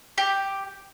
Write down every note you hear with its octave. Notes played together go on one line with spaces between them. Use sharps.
G4